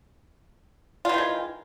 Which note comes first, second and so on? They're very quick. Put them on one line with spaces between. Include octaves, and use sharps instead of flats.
F4 E3 D#3 G#3